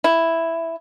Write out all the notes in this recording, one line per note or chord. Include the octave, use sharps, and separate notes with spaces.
E4